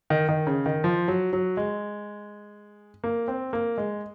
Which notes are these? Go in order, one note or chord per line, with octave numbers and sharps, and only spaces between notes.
D#3
D#3
C#3
D#3
F3
F#3
F#3
G#3
A#3
C4
A#3
G#3